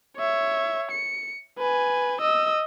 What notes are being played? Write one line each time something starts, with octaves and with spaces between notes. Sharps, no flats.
C#5 E5
C#7
B4 G#5
D#5 E6